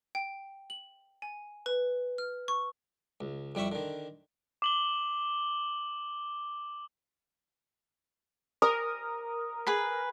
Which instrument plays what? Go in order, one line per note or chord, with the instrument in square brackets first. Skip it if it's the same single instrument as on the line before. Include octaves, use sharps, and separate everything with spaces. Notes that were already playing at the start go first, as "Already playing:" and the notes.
[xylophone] G5
F#7
G#5
B4
F6
C#6
[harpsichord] C#2
F2 G3 E4 E5 C#6
D3 D#3
[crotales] D6 F#7 G7
[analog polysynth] A#4 [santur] D#6
[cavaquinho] G#4 B4 B5